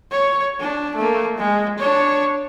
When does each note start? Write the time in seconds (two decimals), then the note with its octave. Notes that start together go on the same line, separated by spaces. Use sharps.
0.11 C#5
0.60 D4
0.96 A3 A#3
1.38 G#3
1.79 D4 C#5